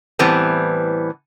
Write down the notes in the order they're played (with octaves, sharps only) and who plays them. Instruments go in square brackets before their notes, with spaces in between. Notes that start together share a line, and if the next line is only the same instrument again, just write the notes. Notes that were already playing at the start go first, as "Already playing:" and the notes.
[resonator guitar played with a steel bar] A2 E3 G3 B3 C4